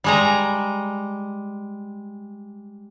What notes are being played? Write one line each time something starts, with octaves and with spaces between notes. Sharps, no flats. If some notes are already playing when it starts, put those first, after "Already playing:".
G3 G#3 A#5